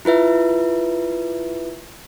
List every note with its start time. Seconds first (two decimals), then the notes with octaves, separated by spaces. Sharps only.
0.05 E4 F4 B4 E5